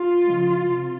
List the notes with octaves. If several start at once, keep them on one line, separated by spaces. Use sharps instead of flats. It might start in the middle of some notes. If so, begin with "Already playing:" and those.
Already playing: F4
C#3 F3 G#3
C3